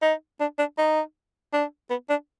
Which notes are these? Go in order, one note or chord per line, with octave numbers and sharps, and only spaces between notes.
D#4
D4
D4
D#4
D4
B3
D4